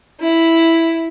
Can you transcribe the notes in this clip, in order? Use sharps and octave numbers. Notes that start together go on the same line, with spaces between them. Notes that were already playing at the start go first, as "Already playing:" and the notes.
E4